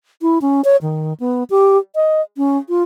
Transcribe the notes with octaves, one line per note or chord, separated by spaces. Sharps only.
E4
C#4
C#5
D#3
B3
G4
D#5
C#4
F4